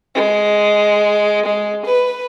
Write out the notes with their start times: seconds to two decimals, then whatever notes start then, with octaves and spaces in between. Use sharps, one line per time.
0.15 G#3
1.45 G#3
1.86 B4